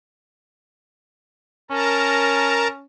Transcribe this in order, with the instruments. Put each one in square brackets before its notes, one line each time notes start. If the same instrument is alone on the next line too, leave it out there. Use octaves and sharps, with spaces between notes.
[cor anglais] C#4 [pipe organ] A#4 A5 A#5